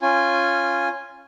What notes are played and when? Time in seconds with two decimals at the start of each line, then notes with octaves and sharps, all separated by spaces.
0.02 C#4 F4 G#5